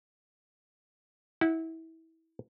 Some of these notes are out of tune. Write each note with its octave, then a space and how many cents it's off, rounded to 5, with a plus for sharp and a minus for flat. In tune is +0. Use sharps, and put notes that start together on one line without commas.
E4 -25 F#5 +0